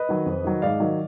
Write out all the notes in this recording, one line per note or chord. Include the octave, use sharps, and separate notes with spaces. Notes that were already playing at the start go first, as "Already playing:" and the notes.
Already playing: B4 D#5
D#3 F#3
F2
D#3 F#3
G#2 D5 F5
D#3 F#3